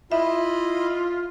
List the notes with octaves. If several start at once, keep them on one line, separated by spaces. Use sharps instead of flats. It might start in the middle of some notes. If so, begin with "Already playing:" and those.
E4 F4 D#5 E5 B5